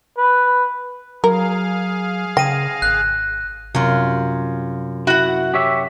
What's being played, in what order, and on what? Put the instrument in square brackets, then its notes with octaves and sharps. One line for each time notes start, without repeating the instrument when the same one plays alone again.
[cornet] B4
[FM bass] F#3 [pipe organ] G#4 F5 [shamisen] A#4
[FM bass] C#3 [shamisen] G5 [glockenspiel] A#6 D#7
[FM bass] G#1 [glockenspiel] F#6
[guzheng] F#2 F4 [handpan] C3
[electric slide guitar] E4 [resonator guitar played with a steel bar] F#4 F#5
[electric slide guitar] G4 C#5 E5